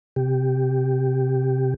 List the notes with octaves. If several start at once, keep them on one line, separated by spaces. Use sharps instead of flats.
C3 G4